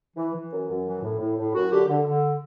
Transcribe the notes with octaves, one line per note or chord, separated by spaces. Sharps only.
E3
E3
F#2
F#2
E3
A2
A2
A2
F#2 F#4
D3 G4
D3
D3